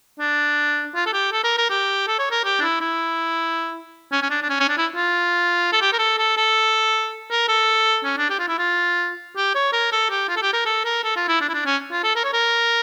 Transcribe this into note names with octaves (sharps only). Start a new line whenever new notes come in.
D4
F4
A4
G4
A4
A#4
A#4
G4
A4
C#5
A#4
G4
D4
E4
E4
C#4
C#4
D4
D4
C#4
C#4
D4
E4
F4
A4
G4
A#4
A4
A4
A4
A#4
A4
C#4
D4
G4
F4
E4
F4
G4
C#5
A#4
A4
G4
F4
A4
G4
A#4
A4
A#4
A4
F4
E4
D4
E4
D4
C#4
F4
A4
A#4
C#5
A#4